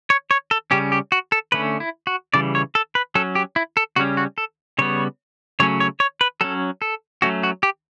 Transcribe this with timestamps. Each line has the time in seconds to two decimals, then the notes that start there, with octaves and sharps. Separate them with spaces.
0.10 C#5
0.31 C#5
0.51 A4
0.71 C#3 G3 C#4 G4
0.92 G4
1.12 F#4
1.32 A4
1.52 D3 A3 C#4 B4
1.80 E4
2.07 F#4
2.34 C#3 E3 G3 D5
2.55 C#5
2.75 A4
2.95 B4
3.15 F#3 C#4 A4
3.35 G4
3.56 E4
3.77 A4
3.96 C#3 G3 C#4 F#4
4.17 F#4
4.38 A4
4.79 C#3 G3 B3 C#5
5.60 C#3 F#3 A3 C#4 C#5
5.80 C#5
6.00 C#5
6.21 B4
6.41 F#3 C#4 A4
6.82 A4
7.22 F#3 A3 C#4 F#4
7.43 F#4
7.63 G4